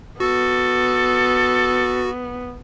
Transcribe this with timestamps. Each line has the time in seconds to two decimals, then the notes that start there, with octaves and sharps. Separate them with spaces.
0.20 B3 F#4 A4